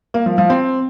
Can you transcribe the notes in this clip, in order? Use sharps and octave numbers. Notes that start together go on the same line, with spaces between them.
A#3
F3
F3
C4